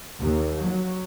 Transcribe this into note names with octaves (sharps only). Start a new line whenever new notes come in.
D#2
F#3